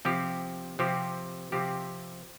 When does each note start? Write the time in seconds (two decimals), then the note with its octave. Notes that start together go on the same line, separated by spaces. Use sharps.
0.05 C3 F3 C4 G4
0.79 C3 F3 C4 G4
1.52 C3 F3 C4 G4